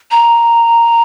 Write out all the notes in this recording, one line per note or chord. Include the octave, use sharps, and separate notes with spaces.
A#5